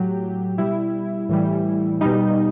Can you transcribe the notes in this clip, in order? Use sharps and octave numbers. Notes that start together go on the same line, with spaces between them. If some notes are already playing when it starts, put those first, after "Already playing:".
Already playing: A2 F#3 G4
B2 G3 E4
A2 E3 G3
B2 G3 D#4